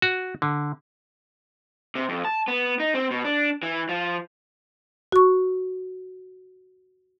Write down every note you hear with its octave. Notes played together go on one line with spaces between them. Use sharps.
F#4
D3
C3
F2
A5
B3
D#4
C4
B2
D4
E3
F3
F#4 C#6